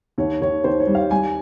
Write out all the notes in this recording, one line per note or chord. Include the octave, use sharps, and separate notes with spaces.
D#2 C#5
D#2 C#5
D#2 C5
C#5
G3
F5
G3 G#5